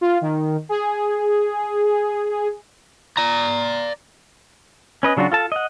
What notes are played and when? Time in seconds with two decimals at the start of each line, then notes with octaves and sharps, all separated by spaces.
0.01 F4
0.21 D#3
0.69 G#4
3.17 D5 A#5
5.03 C#4 B4 D#5
5.17 C#3 F#3 D4 F4 F#4
5.32 F4 A4 A5
5.52 D#5 F#5